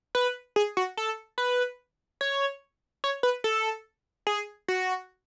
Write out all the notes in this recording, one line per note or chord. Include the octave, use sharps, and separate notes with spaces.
B4
G#4
F#4
A4
B4
C#5
C#5
B4
A4
G#4
F#4